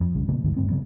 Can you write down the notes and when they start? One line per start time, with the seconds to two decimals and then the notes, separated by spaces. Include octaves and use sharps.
0.01 F2
0.15 B1 C#3 G3
0.28 A#2 C#3 A#3 B3
0.44 G1 D2 G#2 D#3
0.57 D1 D2 G2 C4
0.70 C#3 F#3 B3